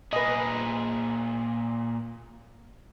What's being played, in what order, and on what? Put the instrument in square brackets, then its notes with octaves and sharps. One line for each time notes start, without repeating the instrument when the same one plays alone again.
[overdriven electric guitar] A#2 G#4 [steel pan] B4 D#5